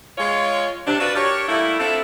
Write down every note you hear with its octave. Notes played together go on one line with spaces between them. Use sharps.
G#3 F4 C#5
C3 D4
F4 F#4 B4 D5
D4 G4 A#4 C#5
G3 A3 A#3 E4
A3 C4 D4 E4 F4 A4